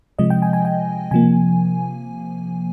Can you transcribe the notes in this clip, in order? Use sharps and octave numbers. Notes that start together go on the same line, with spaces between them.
C3 F3 G#3 D#5
G5
G#5
G#5
G5
C3 F3 A#3 G#5